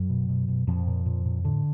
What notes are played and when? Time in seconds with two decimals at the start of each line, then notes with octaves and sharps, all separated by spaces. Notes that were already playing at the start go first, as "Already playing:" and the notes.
Already playing: F#2 F#3
0.09 B2
0.29 B2
0.48 B2
0.67 F2 A#2 F3
0.87 A#2
1.06 A#2
1.25 A#2
1.44 A2 D3